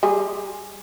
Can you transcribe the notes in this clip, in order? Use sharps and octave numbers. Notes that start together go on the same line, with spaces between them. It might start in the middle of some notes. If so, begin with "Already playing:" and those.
G3 G#4